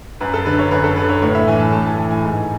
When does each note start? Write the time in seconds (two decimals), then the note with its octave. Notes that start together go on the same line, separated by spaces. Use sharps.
0.20 F#2 B4
0.34 A4
0.46 D3 B4
0.59 C#5
0.71 F#2 B4
0.84 A4
0.96 D3 B4
1.09 C#5
1.22 A2 C#5
1.35 E5
1.48 E3 G#5
1.59 A5
1.72 A2 A5
1.85 A5
1.98 E3 A5
2.11 G#5
2.23 G#2